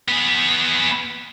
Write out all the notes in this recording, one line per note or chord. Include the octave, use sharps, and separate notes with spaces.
B3 G#4